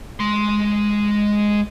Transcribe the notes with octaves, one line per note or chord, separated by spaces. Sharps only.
G#3 C6